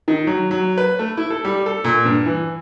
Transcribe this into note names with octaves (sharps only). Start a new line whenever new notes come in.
D#3
F#3
F#3
B4
A3
E4
A4
G3
A4
A#2
G2
E3